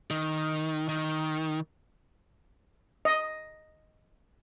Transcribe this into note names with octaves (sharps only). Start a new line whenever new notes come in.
D#3
D#3
D#5